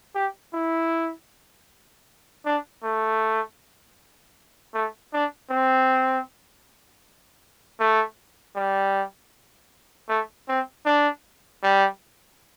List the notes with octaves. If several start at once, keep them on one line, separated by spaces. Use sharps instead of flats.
G4
E4
D4
A3
A3
D4
C4
A3
G3
A3
C4
D4
G3